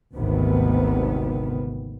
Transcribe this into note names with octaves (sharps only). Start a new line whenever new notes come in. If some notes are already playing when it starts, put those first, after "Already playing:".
G#1 D2 G#2 C3 D#3 B3